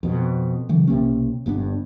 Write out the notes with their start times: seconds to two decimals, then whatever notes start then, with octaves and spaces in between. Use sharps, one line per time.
0.03 F2 B2
0.69 C#3 E3 F#3
0.87 B1 C3 A#3 C#4
1.46 G1 G2 B3 D4